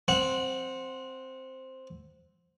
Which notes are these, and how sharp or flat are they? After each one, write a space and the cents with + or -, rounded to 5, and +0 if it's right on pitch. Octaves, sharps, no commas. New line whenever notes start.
C4 +0 F#5 -15